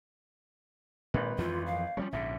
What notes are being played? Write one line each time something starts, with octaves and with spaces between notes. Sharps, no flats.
G#1 A#2 B4
F2 E3 F3 F4
F5
F3 G3 G#3 C#4
A#1 G#2 D3 E5